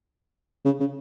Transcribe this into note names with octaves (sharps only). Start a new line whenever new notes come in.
C#3
C#3